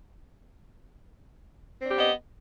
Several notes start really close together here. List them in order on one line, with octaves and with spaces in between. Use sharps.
C4 D4 G4 B3 D#5